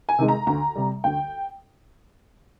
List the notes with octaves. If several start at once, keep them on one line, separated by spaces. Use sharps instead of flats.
G#5
C3 D#3 G#3
A#5
D2 A#5
C3 G3
D2 G5